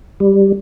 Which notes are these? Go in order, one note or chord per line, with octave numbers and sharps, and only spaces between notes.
G3